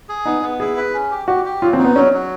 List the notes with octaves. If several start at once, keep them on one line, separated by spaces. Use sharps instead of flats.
G#4
B3 D#4
B3
E4 G#4
B4
C#4
G4
F#4 G4
G4
F#3 F4
C4
D#4
B3
F#3 C#4
F#3